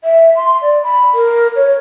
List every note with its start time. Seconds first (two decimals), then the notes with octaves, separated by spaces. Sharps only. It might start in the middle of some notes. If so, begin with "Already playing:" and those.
0.04 E5
0.36 C6
0.62 D5
0.84 B5
1.15 A#4
1.56 C#5